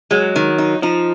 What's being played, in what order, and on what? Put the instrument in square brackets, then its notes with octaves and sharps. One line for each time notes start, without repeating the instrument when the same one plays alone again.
[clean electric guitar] F#3 [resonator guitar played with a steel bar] G#3
[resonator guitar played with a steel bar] D#3
D#4
[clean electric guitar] F3 [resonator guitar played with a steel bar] D#4